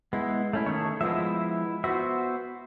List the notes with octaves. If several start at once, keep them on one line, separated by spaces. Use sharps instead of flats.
G#3 B3 E4
A3 C#4 E4
D#3 A3 G#4 A4 C#5
F3 G#3 B3 E4 E5
B3 F#4 C5 E5